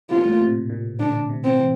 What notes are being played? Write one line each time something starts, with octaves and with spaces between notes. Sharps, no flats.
C3 F4
A#2
A2
A#2
C3
A#2
D3 D4
C3
C4
E3